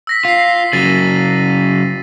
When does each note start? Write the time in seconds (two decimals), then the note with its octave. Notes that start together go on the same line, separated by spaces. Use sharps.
0.07 E6 A#6 B6
0.25 F4 B6 C7
0.73 C#3 F#3 A6 D#7